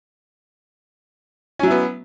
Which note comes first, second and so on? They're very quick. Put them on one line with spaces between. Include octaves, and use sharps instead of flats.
C#4 F#3 E4 B3